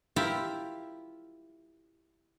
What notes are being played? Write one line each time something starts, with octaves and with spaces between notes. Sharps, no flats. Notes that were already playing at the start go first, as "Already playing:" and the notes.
E4 F4 G4 A#4 E5